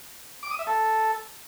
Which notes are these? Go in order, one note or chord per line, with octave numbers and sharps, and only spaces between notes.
D6
D#6
E5
A4